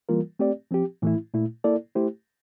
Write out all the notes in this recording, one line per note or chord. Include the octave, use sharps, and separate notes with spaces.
E3 G3 A#3 F4 A#4
A3 C4 G4 D5
F3 C4 G4
A2 E3 A3 E4
A#2 A3 E4
A#3 E4 A4 D5
A3 E4 G4 C5